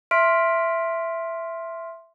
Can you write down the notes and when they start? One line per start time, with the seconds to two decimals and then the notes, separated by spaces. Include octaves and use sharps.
0.11 E5 C6 F6 B6 D7